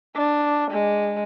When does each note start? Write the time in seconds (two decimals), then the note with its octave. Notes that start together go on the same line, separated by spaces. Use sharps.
0.16 D4
0.71 G#3